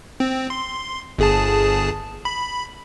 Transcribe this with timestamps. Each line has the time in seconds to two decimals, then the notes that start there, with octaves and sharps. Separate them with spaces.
0.20 C4
0.50 C6
1.19 G1 G#4 A5
2.25 B5